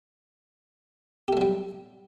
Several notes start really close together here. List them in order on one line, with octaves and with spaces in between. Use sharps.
G4 A3 F#3 G3